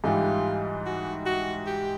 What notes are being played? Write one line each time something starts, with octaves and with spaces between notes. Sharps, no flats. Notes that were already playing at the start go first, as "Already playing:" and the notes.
G#2 E3 G3 F4
F#4
F#4
G4